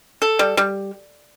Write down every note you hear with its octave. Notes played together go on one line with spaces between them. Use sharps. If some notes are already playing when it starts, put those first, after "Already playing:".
A4
G3
G3